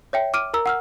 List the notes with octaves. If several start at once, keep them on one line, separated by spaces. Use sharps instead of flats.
C#5 E5 G5
D6 F6 D7 D#7
A#4 A#5 E6
F#5 E6 F6